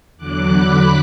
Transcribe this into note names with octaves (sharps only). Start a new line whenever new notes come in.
E2 D3 F#3 D6 F#6
B5 D6